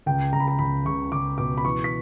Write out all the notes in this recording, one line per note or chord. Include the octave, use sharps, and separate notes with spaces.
C#2 G5
C#2 A#5
B5
A#5
C#2 B5
C#2 C#6
C#2 D6
B2 D6
B5
E3 C#6
B6